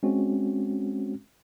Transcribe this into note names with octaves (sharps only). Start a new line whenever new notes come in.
G#3 C4 C#4 F#4